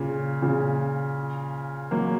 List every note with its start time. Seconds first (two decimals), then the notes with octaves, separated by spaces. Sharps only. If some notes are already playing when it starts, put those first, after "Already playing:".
Already playing: A#2 C#3
0.42 A#2 C#3
1.91 F#3 A#3